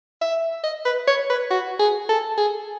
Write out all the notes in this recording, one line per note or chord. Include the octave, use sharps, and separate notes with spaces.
E5
D#5
B4
C#5
B4
F#4
G#4
A4
G#4